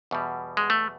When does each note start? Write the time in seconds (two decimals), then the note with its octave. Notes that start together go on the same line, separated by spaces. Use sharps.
0.11 E2 B2 G3
0.57 G#3
0.70 A3